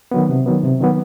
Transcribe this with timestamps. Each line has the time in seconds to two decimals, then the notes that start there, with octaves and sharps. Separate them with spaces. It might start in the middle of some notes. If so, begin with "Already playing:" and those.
0.11 D#3 F#3 B3
0.29 C3
0.46 D#3 F#3 B3
0.63 C3
0.81 D#3 F#3 B3